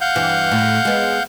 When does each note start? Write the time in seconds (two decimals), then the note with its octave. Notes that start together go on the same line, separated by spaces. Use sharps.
0.01 F5 F#5 G6
0.15 G2 E3
0.52 A2
0.85 G#3 B3